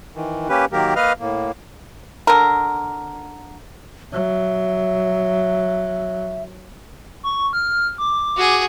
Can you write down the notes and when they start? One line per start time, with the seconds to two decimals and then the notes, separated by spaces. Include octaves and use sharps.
0.15 D#3 E3
0.49 A#3 C#4 G4 B4
0.72 D#3 F#3 A#3 G4 A#4
0.96 A#3 B4 D#5 F5 F6
1.20 A2 A#3
2.27 D3 A#4
4.12 F#3 E5
7.23 C#6
7.53 F6
7.98 D6
8.36 F#4 G#4